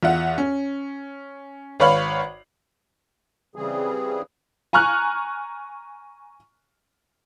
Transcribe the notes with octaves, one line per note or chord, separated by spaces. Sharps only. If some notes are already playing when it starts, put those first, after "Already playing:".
E2 F4 E5 F#5
C#4
G#1 B4 C#5 F5 B5 F#7
C#3 E3 G3 C4 G#4
G#5 A#5 C#6 F6 F#6